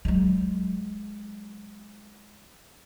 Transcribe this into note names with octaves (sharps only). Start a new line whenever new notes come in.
F#3 G#3